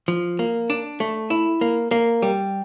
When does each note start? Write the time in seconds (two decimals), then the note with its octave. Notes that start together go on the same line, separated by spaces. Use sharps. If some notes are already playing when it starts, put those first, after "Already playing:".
0.08 F3
0.39 A#3
0.70 D4
1.00 A3
1.30 E4
1.61 A#3
1.91 A#3
2.22 G3